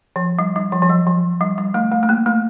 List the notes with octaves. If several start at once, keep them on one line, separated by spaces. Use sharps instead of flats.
F3
G3
G3
F3
F3
F#3
F3
G3
G3
A3
A3
A3
A#3
A3